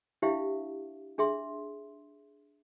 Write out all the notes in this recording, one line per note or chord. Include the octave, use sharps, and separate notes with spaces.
D4 E4 G4 C5 E5 F5
D4 G#4 E5 C6